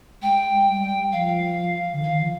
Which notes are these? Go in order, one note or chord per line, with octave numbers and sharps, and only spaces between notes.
G#3 G5
G3
F3 F5
D3
D#3 F5
F3